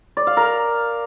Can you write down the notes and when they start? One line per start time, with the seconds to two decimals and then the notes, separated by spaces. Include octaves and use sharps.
0.17 D5
0.27 F5
0.37 A#4